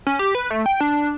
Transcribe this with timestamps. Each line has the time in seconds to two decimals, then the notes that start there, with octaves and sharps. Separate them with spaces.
0.07 C#4
0.19 G4
0.35 B4
0.51 A3
0.66 G5
0.81 D4